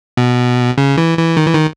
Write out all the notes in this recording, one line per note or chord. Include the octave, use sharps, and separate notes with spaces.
B2
C#3
E3
E3
D#3
E3
D#3